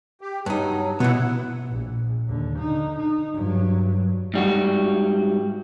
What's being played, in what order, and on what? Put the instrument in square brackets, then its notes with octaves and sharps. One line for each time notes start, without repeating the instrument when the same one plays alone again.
[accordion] G4
[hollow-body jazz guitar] G2 D#4 [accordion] F#3
[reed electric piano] B2 [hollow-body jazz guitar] E3 B3 [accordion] E4 F#5
[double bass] A#1
D#2 D3
D3 D#4
D#4
G2 F#3
[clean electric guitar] G#2 G3 F#4